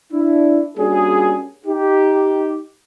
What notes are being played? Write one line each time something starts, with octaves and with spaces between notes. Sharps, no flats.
D4 E4
G3 A#3 C#4 D4 F#4 G#4
D#4 G4